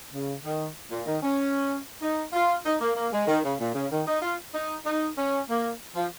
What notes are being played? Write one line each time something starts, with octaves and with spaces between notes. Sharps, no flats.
C#3
D#3
A#2
D#3
C#4
D#4
F4
D#4
A#3
A#3
G#3
D#3
C#3
A#2
C#3
D#3
D#4
F4
D#4
D#4
C#4
A#3
F3